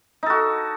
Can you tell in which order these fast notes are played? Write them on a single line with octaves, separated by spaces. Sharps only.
D#4 A4 F#4